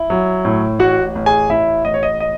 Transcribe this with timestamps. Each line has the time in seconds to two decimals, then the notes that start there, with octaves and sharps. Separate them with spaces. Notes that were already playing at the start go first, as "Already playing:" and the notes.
Already playing: E4
0.10 F#3
0.45 A2
0.79 A1 F#4 F#5
1.15 A1
1.26 G#4 G#5
1.50 A1 E4 E5
1.85 A1 D#5
1.94 C#5
2.03 D#5
2.20 D#5